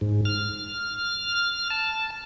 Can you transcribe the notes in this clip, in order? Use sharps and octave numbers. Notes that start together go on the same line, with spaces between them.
G#2
F6
A5